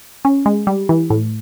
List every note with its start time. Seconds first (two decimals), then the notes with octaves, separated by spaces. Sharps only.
0.25 C#4
0.46 G#3
0.67 G3
0.89 E3
1.10 A2